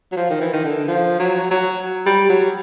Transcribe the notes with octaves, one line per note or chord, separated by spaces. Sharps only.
F#3
F3
D#3
E3
D#3
D3
F3
F#3
F#3
G3
F#3